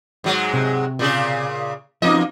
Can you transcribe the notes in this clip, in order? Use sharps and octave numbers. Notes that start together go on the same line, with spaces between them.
G#2 F#3 G#3
C3
A#2 C#3 G#4
F2 F3 A#3 C4 D#4 D#5